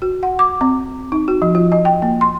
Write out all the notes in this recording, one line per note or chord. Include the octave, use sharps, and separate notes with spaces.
F#4
F#5
D6
C4
D#4
F#4
F3
F4
D#5
G5
A#3
C6